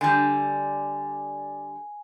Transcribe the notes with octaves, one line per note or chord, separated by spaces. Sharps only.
D3 G3 G#5